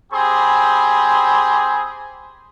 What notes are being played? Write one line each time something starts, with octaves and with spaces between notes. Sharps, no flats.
C4 G4 G#4 B5 C6